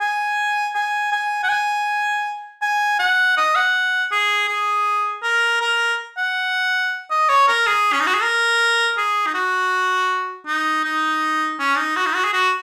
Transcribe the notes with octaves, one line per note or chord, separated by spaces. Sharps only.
G#5
G#5
G#5
F#5
G#5
G#5
F#5
D#5
F#5
G#4
G#4
A#4
A#4
F#5
D#5
C#5
A#4
G#4
C#4
D#4
F#4
G#4
A#4
G#4
D#4
F#4
D#4
D#4
C#4
D#4
F#4
D#4
F#4
G#4
F#4